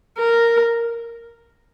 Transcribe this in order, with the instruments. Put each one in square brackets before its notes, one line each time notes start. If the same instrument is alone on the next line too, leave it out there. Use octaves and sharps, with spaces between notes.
[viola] A#4